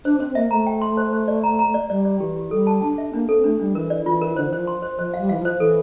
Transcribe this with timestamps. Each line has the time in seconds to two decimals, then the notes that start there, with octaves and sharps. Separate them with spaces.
0.05 D4 C5
0.20 C4 C5
0.35 A#3 E5
0.51 A3 A#5
0.67 G5
0.82 C6
0.97 C5
1.13 C5
1.28 D5
1.44 A#5
1.59 A#5
1.74 D5
1.89 G3 D5
2.05 D5
2.20 E3 G4
2.36 G4
2.51 G3 A4
2.67 A5
2.82 D4 A5
2.98 E5
3.13 A#3 D4
3.28 C4 A4
3.44 A3 D4
3.59 G3 D4
3.75 E3 A#4
3.90 D5
4.06 E3 F4
4.21 A#4
4.36 D3 C5
4.49 E3
4.53 F3 C5
4.67 C6
4.82 C5
4.98 F3 C5
5.14 F5
5.19 G3
5.29 E3 F5
5.40 F3
5.45 C5
5.60 E3 A4